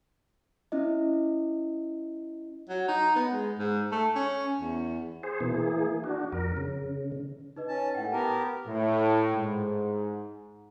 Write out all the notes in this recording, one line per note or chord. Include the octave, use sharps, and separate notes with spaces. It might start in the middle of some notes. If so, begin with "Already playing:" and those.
C#4 E4 D#5
F#3
D#4
B3
G#3
G#2
A3
C#4
E2
G#4 C5
B2 E3 A#3
E3 A#3 G#4
D4 F#4
F2 A#4
C#3
D#4 B4 D#5
C#4 A5
A2 F#5 G5
B3 G4 A#4 A5 A#5
A2
G#2